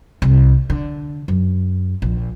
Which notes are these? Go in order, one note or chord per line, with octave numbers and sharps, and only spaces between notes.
C2
D3
F#2
A#1